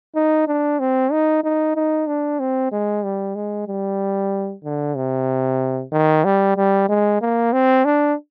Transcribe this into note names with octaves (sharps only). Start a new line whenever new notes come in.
D#4
D4
C4
D#4
D#4
D#4
D4
C4
G#3
G3
G#3
G3
D3
C3
D#3
G3
G3
G#3
A#3
C4
D4